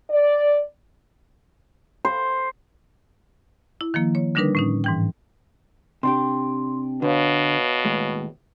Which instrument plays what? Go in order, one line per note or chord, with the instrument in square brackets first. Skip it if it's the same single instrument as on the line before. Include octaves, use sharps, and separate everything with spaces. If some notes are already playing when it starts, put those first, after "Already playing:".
[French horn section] D5
[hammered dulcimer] C5
[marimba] E4
D#3 F3 A#3
C#5
D3 G3 D4 D#4 A#4 B4
A2 C#4 D#4
G#2 E3 G5
[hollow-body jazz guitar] C3 D4 G4 [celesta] C6
[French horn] B2 [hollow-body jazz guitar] D3 [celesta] B4 C#5 F5
[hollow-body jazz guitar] D#2 A2 G#3